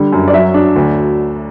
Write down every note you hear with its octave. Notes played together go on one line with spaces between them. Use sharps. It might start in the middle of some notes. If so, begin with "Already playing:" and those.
Already playing: D3 G3
F#2
D5
F#3 E5
D4
D2